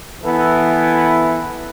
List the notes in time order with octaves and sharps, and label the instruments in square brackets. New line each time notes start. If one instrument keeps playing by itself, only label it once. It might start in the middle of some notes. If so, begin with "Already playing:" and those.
[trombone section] E3 B3 E4 A4